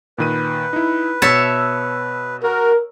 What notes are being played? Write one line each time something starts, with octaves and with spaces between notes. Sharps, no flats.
A#2 D#3 B4 D#7
D#4 E4
B2 C#5 E5 A5 E6
F#4 A#4